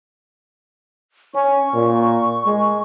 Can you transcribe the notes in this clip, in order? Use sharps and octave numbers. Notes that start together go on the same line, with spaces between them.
C#4 C#6
A#2
G#3